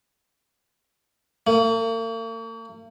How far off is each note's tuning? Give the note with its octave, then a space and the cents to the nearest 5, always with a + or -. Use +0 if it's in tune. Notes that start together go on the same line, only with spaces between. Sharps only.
A#3 -45